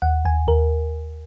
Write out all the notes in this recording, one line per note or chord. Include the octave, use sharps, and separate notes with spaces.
D#2 F#5
D#2 G#5
D#2 A#4